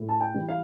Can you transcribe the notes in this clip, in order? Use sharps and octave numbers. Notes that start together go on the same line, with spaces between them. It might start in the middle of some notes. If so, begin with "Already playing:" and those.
Already playing: A2
A5
G5
E3 G3
F5